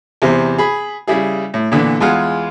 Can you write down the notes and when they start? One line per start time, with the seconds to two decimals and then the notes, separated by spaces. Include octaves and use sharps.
0.22 E2 C3 C5
0.58 G#4 B5
1.07 C#3 G3 E4 G#4
1.54 A2
1.72 A#2 D3 E3 B3
2.01 E2 G#3 F4 F#5 F6